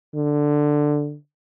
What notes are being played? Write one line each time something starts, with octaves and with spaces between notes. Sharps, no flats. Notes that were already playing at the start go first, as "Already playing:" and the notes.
D3